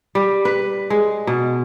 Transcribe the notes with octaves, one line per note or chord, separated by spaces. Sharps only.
G3
B4
G#3
B2